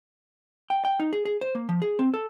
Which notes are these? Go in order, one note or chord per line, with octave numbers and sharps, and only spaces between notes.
G5
G5
D#4
G#4
G#4
C5
A#3
F3
G#4
C4
A4